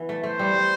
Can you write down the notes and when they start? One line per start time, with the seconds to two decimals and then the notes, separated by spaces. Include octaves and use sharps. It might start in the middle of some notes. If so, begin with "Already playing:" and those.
Already playing: E3 B3
0.09 A3
0.23 A3 C5
0.39 G3
0.54 G3